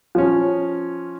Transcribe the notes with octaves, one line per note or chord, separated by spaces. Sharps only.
F3 C#4